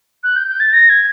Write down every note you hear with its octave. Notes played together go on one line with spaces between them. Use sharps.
F#6
G6
G6
A6
A#6
G#6